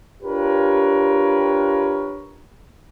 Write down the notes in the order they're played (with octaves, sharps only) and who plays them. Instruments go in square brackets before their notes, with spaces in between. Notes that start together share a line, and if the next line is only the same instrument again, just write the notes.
[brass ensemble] D4 F4 G4 A#4 B4 C#5